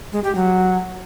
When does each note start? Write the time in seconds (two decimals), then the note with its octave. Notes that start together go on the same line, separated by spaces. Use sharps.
0.12 G#3
0.24 G4
0.35 F#3